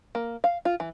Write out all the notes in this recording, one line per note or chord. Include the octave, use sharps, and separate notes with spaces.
A#3
F5
F4
E3